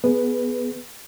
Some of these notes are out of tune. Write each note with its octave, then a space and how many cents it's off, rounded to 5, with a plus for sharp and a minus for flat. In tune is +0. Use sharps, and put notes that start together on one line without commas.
B3 +0 G#4 +15 B4 +0